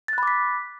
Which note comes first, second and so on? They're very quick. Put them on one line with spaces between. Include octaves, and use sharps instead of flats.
A6 F#6 B5 D6 B6